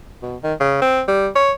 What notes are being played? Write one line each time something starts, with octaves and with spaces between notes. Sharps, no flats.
B2
D#3
C#3
C4
G3
C#5